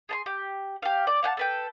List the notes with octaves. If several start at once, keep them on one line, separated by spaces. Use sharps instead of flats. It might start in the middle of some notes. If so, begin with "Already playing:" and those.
G#4 A5 C6
G4
G4 F5
D5
F5 F#5 G#5 A5
A4 B4 G5